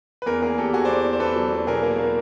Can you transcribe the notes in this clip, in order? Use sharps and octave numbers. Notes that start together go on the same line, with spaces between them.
B4
E2 G#4 A#4
A#3 G#4 A#4
E2 G4 A4
E2 F#4 G#4
C5 D5
E2
E2
C5
E2 A4 B4
F#3
E2
B2 G#4 A#4
A#3
A#3